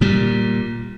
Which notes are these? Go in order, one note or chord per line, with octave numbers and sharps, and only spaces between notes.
A#2 G3